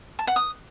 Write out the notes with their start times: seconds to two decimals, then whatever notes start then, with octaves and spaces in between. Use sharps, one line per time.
0.19 A5
0.27 F#5
0.36 D#6